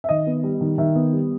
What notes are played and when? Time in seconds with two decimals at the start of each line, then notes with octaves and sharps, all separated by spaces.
0.04 E5
0.09 D#3 D#5
0.27 B3
0.44 G3
0.61 D#3
0.78 D#3 E5
0.95 B3
1.13 G3